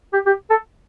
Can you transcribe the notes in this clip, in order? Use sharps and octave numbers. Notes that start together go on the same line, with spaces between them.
G4
G4
A4